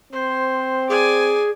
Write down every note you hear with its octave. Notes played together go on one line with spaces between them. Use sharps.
C4 C5
G#4 D5 G#5